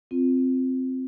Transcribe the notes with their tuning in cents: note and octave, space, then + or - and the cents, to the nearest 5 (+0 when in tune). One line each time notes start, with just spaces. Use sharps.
C4 -5 F4 +0